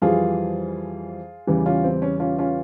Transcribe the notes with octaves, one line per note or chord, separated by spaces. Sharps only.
F2 E3 G3 F4 G#4
E2 C#3 E3 G3
C#4 F4
C4
C#4
C#4 F4
C#4 F4